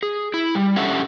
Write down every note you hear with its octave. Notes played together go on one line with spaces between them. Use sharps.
G#4
E4
G3
C#4 D4 G4 A4 E5 F#5